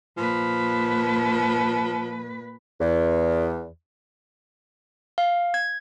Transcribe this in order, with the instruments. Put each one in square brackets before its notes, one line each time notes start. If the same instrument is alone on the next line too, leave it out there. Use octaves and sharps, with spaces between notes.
[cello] A#2 B4 [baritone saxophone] F3
[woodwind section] E2
[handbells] F5
G#6